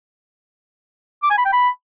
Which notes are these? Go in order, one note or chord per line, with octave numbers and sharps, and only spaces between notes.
D6
G#5
B5
G5
B5